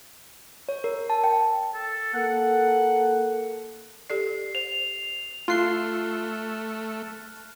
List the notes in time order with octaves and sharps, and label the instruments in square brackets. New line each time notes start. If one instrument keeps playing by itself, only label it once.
[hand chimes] C#5
A#4
A5
G5
[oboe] A4
[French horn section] A#3 A4 [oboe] F#5
[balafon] G4 A4 D5 [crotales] C7
[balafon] C5 [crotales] F7
[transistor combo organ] A3 [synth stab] F4 C7 [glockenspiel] F6 F#6 G7